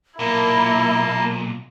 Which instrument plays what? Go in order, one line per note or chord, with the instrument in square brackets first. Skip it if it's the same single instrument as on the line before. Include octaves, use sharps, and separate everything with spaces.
[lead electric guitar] B1 A#2 [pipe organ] A#3 D#5 A5 [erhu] E4 [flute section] A#4 A#5